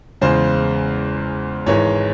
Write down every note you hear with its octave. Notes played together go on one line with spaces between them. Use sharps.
E2 C#3 G#3 C5
G#1 G#2 E3 G#3 C#5